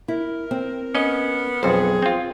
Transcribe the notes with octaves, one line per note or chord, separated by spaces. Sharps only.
E4 A#4
C4
B3 C#4 D#5
B1 F2 G#4 C5
C4 F4